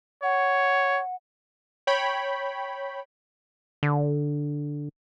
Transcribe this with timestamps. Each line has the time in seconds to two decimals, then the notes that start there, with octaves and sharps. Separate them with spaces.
0.23 C#5 F#5
1.87 C#5 G5 B5
3.83 D3